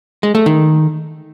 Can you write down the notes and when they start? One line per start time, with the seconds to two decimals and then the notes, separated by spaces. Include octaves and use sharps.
0.23 G#3
0.35 A3
0.46 D#3